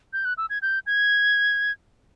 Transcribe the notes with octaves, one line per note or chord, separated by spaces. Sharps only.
G6
F#6
E6
G#6
G6
G#6